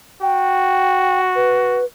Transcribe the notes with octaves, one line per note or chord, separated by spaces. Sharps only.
F#4 G5
B4